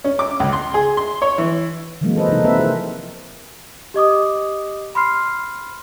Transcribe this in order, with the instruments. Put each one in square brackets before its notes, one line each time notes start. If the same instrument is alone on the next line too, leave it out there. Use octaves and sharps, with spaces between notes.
[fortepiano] C#4
D6
C#2
C6
G#4
C6
C#5
E3
[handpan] D#3 E3 F#3 G#3 A#3 C4
A4 B4 C5 D#5
C3 D#4
F3 A#3 C4 A4 B4 E5
E4 G#4 A#4 C5
[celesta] G4 D#5 D6 D#6
B5 C6 F6 C7